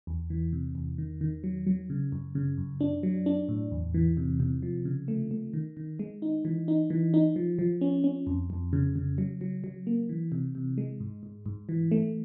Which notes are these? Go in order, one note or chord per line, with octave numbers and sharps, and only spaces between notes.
E2
E3
C3
E2
D#3
D#3
F#3
F#3
C#3
F#2
C#3
F#2
D4
F#3
D4
A2
E2
E3
C3
C3
F3
C#3
A3
A3
D#3
D#3
G#3
D#4
E3
D#4
E3
D#4
F3
F3
C#4
C#4
F2
F2
C#3
C#3
F#3
F#3
F#3
A#3
E3
C3
C3
G#3
G#2
G#2
G#2
E3
A3